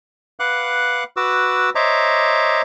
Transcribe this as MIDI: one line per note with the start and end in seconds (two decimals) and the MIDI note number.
0.40 1.04 71
0.40 1.04 77
0.40 1.04 78
0.40 1.04 86
0.40 1.04 90
1.17 1.70 66
1.17 1.70 71
1.17 1.70 86
1.17 1.70 88
1.75 2.62 72
1.75 2.62 73
1.75 2.62 75
1.75 2.62 76
1.75 2.62 82
1.75 2.62 86